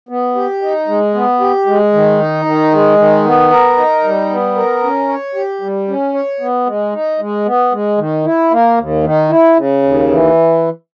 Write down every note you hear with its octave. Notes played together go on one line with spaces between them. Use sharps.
B3
G4
D#4
G#3
B3
G4
G#3
D#3
D#4
D#3
G#3
D#3
B3
A#4
D#4
G3
B3
A#4
C#4
C#5
G4
G3
C#4
C#5
B3
G#3
D#4
G#3
B3
G#3
D#3
E4
A#3
D#2
D#3
E4
C#3
D#2
E3